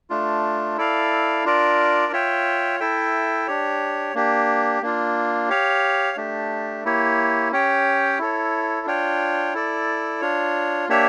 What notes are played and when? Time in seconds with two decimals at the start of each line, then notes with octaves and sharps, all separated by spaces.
0.10 A3 D4 F4
0.78 E4 A4 D5 F5
1.45 D4 F4 A#4 D5
2.12 F4 C#5 E5 G5
2.80 E4 A4 E5 G5
3.47 D4 G4 C#5
4.15 A#3 D4 G4
4.82 A#3 D4 F4
5.49 G4 C#5 F5
6.17 A3 D4 G4
6.84 A#3 E4 G4 C#5
7.52 C#4 G4 C#5 G5
8.19 E4 A4 C#5
8.86 D4 F4 C#5 G5
9.54 E4 A4 D5
10.21 D4 F4 C#5
10.89 A#3 D4 G4 C#5 E5